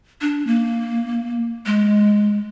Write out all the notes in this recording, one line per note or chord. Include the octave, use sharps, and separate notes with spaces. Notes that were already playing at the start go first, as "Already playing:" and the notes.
D4
A#3
G#3